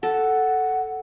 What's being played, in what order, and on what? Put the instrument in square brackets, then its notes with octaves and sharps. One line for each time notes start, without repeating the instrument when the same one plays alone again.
[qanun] A4 [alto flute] F#5